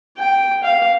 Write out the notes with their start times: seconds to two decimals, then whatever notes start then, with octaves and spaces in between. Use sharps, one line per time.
0.18 G5
0.63 F5